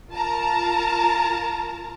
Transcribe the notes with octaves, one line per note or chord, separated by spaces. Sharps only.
F4 A#4 A5 A#5